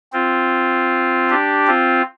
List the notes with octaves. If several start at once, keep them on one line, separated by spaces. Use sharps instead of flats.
C4 F4
D4 G4
C4 F4